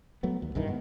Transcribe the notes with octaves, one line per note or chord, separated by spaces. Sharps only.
F#3 A3 B3
D#2
B1 G2 D#3 E3
G#2 B3